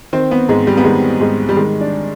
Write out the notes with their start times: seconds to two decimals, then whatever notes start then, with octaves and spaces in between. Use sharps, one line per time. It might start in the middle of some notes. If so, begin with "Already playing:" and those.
0.13 D#3 C4
0.31 B3
0.49 G#2 G#3
0.67 G3
0.77 B3
0.85 D#3 G#3
1.20 G#2 G#3
1.49 G3
1.56 D#3 G#3
1.81 D4